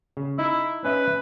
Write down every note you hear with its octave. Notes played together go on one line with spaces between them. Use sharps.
C#3
D#4 E4
C#4 B4 D#5 E5